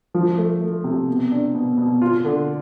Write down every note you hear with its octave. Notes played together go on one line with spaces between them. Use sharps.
F3
A3
A3
C3
B2
D4
B2
B2
F4
D3